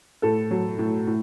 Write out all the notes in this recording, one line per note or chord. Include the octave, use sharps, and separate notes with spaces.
A2 A4
F#3
A2
A2